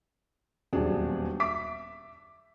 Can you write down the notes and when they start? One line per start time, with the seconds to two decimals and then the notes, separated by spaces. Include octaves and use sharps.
0.73 D#1 E2 B2 F#3 D4 G#4
1.40 E5 D6 B6